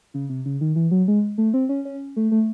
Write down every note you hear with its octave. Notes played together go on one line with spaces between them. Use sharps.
C#3
C3
C#3
D#3
E3
F#3
G#3
A3
C4
C#4
C#4
A3
A3